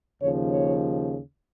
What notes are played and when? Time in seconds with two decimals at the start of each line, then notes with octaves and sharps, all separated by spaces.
0.21 D#2 C#3 F3 C#5
0.52 C#5